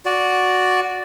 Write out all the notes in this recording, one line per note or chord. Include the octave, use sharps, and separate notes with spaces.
F#4 D5